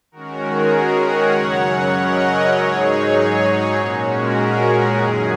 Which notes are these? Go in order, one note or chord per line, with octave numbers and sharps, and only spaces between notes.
D#3 G#3 C#4 F#4 A#4
G#4
F#4 A#4
C#5 F#5
F#2 C#3 F#3 C#4
A#4 D#5
G#2 F#3 D#4 G#4 C#5
G#4 C#5
A#2 G#3 C#4 F#4
F#4 A#4
G#4
F#4 A#4
F#2 D#3 F#3 A#3 G#4